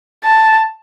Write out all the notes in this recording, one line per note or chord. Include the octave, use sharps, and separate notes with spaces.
A5